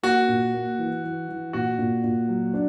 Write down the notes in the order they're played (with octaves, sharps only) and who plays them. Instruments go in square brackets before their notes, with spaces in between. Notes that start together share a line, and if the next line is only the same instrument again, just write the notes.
[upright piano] A#3 [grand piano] F#4
[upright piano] A#2
A#3
E3
E3
E3
[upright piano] A#2 [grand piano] F#4
[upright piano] A#2
A#2
F#3
D4